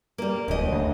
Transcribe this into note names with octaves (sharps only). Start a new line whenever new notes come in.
G3 A#3
D1 D#2 D#5
D2